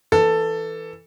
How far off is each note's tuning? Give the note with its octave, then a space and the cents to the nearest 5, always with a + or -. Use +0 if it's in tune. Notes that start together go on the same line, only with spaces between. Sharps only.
E3 +0 A4 +10